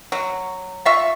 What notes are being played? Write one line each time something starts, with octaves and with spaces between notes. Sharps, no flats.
F#3
F4 E5 C#6